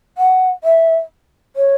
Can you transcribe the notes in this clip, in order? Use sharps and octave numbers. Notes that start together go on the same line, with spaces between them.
F#5
E5
C#5